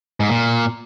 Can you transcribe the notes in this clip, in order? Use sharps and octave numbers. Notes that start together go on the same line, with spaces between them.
G#2
A#2